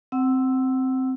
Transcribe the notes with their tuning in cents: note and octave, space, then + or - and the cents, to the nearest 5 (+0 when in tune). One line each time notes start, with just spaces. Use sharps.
C4 +0 F#5 +20 E6 +0